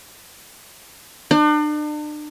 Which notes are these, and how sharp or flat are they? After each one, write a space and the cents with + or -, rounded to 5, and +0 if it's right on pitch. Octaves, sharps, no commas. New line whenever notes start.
D4 +40